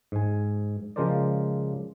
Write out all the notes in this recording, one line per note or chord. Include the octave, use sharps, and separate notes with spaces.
G#2 G#5
C#3 F3 G#3 A#4 C5 D5